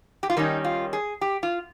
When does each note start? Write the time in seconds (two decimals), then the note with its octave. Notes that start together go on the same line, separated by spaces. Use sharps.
0.23 G4
0.30 F4
0.37 D#3 G3 C#4 D#4
0.64 F4
0.93 G#4
1.21 G4
1.43 F4